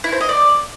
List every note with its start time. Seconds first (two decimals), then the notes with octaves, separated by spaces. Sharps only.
0.04 E4
0.12 C5
0.21 D#5
0.29 D5